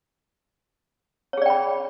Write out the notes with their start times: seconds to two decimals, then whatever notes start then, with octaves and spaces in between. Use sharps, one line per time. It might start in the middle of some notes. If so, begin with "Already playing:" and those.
1.33 C#5
1.37 G#4
1.42 D5
1.46 G5
1.50 B5